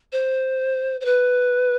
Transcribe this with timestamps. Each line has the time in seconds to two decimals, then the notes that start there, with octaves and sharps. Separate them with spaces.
0.12 C5
1.01 C5
1.05 B4